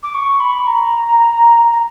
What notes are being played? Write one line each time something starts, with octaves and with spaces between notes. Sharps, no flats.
D6
C#6
B5
A#5
A#5